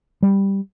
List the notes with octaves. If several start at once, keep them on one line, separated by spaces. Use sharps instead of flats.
G3